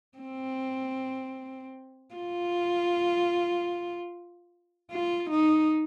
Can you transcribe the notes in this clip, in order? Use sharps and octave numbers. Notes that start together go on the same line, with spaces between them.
C4
F4
F4
D#4